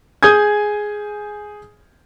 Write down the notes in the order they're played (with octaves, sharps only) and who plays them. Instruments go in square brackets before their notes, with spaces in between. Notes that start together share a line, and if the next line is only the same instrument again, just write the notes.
[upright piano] G#4 G#5 D#6 G6 G#6